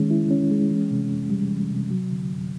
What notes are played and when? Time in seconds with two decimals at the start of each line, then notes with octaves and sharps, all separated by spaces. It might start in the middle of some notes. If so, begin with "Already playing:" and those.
Already playing: D#3 G#3 C#4
0.11 E4
0.31 C#4
0.51 G#3
0.71 E3
0.91 C3
1.11 F2
1.30 G3
1.51 E3
1.71 C3
1.91 F#3
2.11 D3
2.30 F#2